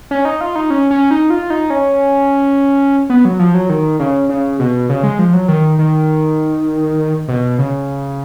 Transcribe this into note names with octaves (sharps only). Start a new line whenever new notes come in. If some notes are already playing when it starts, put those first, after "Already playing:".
C#4
D#4
F4
D#4
C#4
C#4
D#4
F4
D#4
C#4
B3
F#3
F3
F#3
D#3
C#3
C#3
B2
C#3
G#3
F3
F#3
D#3
D#3
B2
C#3